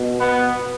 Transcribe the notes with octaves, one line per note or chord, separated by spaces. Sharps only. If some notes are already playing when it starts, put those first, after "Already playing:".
Already playing: B2
B3